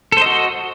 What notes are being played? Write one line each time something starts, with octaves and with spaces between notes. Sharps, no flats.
F#4 A4 C5 D#5